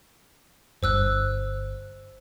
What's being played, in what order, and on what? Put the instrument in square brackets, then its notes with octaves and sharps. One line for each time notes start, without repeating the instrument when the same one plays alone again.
[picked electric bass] G1 G2 [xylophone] C5 E6 F#6